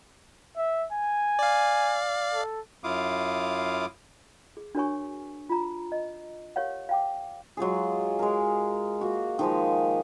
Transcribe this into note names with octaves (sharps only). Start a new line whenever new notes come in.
E5
G#5
D5 F5
A4
F#2 E4 F4 F5 D6 D#6
G#4
D4 F#4 A#4 C#5 G#5 C#6
F4 A#5
D#5
G4 A#4 C#5 F5 F#5
F5 G5 D6
F#3 G#3 F4 G#4
G#3 A#4
A#3 F#4
D#3 F3 G#3